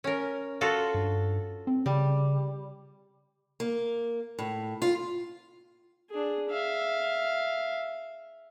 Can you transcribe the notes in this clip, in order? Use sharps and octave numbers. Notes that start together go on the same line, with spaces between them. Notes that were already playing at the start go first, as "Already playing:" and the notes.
C#4 A#4
F4 F#4 A4
G2
C4
C#3 G3
A#3
A2
F4
D4 G#4
E5 F5